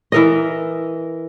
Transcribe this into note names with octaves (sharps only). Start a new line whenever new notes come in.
E3 A#4 D#5